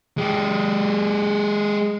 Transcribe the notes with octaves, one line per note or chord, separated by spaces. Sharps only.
G#3 G4